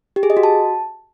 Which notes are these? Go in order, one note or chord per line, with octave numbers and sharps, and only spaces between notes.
G4
G#4
D#5
F#4
A5